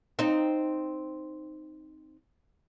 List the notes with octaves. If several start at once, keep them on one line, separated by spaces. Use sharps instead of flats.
C4 D#4